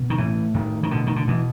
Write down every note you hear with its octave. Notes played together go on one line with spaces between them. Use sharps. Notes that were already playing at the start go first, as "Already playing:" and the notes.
Already playing: B2
D#3
A2 E3
A2 D#3
D#3
B2 D3
D#3
D3
B2 E3